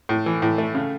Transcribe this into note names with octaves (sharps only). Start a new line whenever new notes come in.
A2
E3
A2
A3
C#3